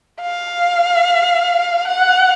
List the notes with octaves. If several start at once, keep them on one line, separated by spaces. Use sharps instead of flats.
F5
F#5